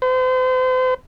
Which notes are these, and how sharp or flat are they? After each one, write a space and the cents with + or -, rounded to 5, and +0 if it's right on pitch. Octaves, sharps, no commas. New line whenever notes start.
C5 -40